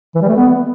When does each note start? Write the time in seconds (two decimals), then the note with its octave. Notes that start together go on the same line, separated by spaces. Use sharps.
0.15 E3
0.22 G3
0.28 A3
0.37 B3